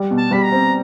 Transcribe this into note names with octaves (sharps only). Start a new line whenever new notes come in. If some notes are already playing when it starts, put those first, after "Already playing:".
Already playing: G3
B2
A5
G3 B5
A#5
C4